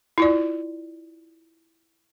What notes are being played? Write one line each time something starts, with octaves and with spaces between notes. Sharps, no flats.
E4 F4 D5